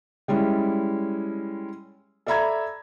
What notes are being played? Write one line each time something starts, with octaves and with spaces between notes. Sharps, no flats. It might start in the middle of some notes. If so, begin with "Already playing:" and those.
G3 G#3 C#4 E4
A4 D5 E5 A#5 B5 G#6